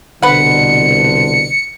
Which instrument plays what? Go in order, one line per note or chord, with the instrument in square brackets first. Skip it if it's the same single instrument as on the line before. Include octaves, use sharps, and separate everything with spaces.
[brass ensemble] C2 B2 D3 [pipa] B4 F#5 [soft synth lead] C#7